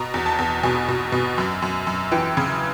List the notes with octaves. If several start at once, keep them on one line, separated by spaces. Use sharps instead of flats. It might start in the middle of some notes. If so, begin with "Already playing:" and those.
Already playing: B2 A#5
E2
A5
E2
B2 G#5
B2
B2
F#2
F#2
F#2
E3 G5
C#3